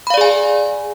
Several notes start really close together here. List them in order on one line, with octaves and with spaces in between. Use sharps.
B5 F5 D5 G#4 G#5